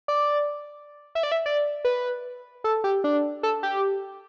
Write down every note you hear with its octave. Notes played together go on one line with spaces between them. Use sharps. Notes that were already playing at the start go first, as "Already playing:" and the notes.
D5
E5
D5
E5
D5
B4
A4
G4
D4
A4
G4